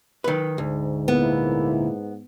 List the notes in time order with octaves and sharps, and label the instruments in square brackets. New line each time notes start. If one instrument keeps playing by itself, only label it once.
[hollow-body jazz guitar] D#3 B4
[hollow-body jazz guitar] D2 [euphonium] G#2
[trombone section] A#2 A#3 E4 [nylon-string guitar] B3